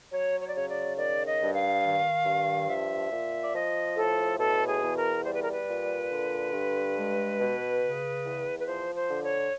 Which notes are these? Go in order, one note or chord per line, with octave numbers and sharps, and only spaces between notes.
F#3 C#5
C#5
D5
C#3 C#5
D5
D#3 D5
D#5
G2
F5
D#3
G2
F3 E5
A#2
D5
F3 D#5
A2 A4
B2 A4
G#4
E2
A#4
G3 C5
B4
A#4
B4
A#2
D3
G2
G#3
B2
C#3
E2
B4
F3 C5
C5
D3
C#5